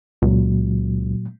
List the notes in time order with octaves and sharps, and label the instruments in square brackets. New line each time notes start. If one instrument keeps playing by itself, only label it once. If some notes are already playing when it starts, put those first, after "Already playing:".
[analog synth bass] C#2 [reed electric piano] A#2 F#3